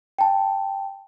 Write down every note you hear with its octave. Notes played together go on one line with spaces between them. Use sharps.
G5 A5